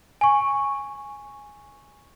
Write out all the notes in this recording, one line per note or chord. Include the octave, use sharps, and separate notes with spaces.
G#5 C#6